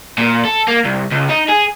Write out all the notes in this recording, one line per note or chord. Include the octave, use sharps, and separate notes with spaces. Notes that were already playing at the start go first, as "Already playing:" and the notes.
A#2
A4
A#3
C2
C#2
D#4
G#4